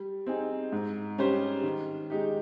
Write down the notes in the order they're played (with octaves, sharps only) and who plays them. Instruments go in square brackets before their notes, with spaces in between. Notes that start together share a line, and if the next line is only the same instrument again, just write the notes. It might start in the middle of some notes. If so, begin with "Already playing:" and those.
Already playing: [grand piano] G3
C4 D#4 G#4
G#2
G3 C#4 G4 C5
D#3
G#3 D#4 G4